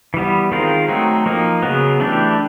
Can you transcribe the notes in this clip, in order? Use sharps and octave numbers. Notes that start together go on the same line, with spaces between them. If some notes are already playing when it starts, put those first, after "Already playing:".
E3 G3 B3
D#3 G#3 C4 F4 A#4
F#3 A3 C4 D#4
F3 A#3 D#4
C#3 F#3 B3
E3 A3 D4 G4